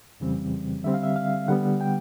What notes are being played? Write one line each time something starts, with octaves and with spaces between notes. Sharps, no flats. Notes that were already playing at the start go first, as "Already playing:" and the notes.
F2 C#3 E3 G3 C4
D3 G3 C4 E5
F5
E5
F5
D3 G3 B3 F#5
G5